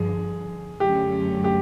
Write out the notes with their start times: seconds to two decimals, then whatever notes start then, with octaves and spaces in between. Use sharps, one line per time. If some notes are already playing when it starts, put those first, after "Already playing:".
Already playing: G2 D3 F3 G#4
0.80 F#2 D3 F#3 A3 C#4 G4
1.44 G4